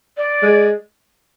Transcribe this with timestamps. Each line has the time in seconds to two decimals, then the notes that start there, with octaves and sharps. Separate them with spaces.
0.17 D5
0.42 G#3